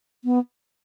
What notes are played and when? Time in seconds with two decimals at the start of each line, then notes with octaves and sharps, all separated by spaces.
0.25 B3